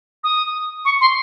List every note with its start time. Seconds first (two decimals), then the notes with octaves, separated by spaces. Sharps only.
0.24 D#6
0.85 C#6
1.01 C6